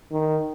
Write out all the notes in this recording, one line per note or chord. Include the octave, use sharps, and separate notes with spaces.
D#3